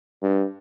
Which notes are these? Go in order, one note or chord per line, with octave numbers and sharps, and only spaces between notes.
G2